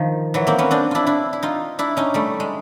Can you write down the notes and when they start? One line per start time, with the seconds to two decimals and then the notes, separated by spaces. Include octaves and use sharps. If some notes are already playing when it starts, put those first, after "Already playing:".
Already playing: D#3 F3
0.34 E3 F#3
0.47 A#3 C4
0.58 B3 C#4
0.71 C4 D4
0.91 D4 E4 F4
1.07 D4 E4
1.33 E4
1.43 D#4 F4
1.79 D4 E4
1.97 C#4 D#4
2.14 G3 A3
2.40 G#3